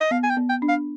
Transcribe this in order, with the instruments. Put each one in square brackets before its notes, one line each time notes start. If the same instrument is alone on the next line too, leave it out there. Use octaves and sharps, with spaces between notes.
[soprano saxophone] D#5
[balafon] B3 [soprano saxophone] F5
[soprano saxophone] G#5
G5
[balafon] B3
[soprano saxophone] G5
[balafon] D4
[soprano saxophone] F5